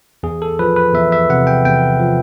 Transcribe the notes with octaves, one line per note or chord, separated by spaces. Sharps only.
E2 G#4
A4
F3 B4
B4
E2 E5
E5
C3 F#5
G5
E2 G5
F3